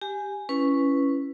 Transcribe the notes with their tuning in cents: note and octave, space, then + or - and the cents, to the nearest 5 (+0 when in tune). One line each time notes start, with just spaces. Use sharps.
G4 +0 G#5 +0
C#4 +0 E4 +20 B4 +0